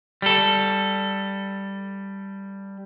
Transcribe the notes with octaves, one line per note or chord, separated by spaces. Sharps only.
G3 A4